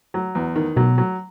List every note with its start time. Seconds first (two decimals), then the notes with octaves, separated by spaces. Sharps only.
0.14 F#3
0.35 E2
0.56 D#3
0.77 B2 F#3
0.98 F#3